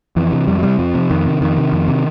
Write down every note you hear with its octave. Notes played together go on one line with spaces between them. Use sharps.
F2 E3
C3
F2 G3
F#3
C3 G3
F2 F3
C3
F2 D#3
C3
F2 D#3
C3
F2
C3